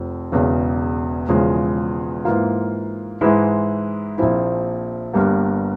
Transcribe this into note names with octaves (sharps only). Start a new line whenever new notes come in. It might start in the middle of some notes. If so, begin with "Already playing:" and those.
Already playing: F1 F2
E1 E2 C#3
E1 E2 C#3 F3 G#3
G#2 E3 A#3 F4
G#2 E3 G#3 E4
A#1 A#2 F3 C4 E4
G1 G2 G3 A#3